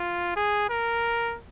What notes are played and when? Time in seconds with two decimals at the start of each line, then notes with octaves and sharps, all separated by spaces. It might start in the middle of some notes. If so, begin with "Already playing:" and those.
Already playing: F4
0.36 G#4
0.70 A#4